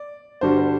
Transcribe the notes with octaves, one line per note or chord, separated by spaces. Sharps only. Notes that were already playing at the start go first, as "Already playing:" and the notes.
Already playing: D5
G2 D3 G3 D4 F#4 C5
C5